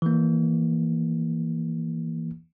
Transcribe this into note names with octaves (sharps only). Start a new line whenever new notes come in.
E3 A#3